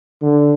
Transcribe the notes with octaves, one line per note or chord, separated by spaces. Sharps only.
D3